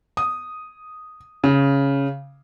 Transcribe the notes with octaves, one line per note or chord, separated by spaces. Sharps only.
D#6
C#3